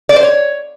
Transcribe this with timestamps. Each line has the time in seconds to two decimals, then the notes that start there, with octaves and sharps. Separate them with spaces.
0.09 D5
0.16 C5
0.23 C#5